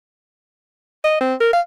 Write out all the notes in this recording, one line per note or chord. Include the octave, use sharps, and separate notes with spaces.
D#5
C4
A#4
F5